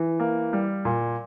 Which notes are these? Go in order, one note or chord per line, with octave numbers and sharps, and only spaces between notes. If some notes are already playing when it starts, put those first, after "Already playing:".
Already playing: E3
A#3
G3
A#2